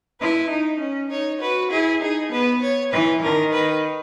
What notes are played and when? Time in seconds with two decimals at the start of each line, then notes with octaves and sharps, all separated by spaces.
0.20 E4 B4
0.50 D#4
0.80 C#4
1.10 D#4 C#5
1.41 F#4 B4
1.71 E4 G#4
2.01 D#4 G#4
2.31 B3 B4
2.62 C#5
2.92 E3 B4
3.22 D#3 A#4
3.53 B4